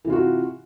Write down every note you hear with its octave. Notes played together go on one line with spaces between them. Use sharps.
C3 E3 F4 F#4